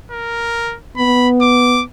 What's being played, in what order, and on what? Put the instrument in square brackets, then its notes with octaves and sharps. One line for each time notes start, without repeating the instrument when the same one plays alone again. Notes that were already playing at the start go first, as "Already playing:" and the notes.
[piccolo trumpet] A#4
[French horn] B3 [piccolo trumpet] B5
[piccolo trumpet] D6